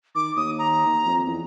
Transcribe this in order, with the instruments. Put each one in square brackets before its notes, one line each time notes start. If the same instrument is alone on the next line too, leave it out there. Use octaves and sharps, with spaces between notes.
[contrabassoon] D#3 [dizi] D6
[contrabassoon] D#2 [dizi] D#6
[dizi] A#5
[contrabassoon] D#2
F2
E2